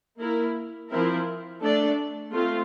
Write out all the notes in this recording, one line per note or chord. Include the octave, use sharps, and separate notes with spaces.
A#3 E4 A#4
F3 C4 E4 A#4
A3 D4 A4 D5
A3 C4 F4